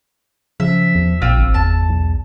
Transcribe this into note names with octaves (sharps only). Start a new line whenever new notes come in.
C#3 F3 E5
E2
A#1 A#2 C4 F4 E6
G1
E2 A5
B1